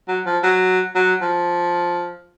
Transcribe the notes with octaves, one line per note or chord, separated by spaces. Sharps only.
F#3
F3
F#3
F#3
F3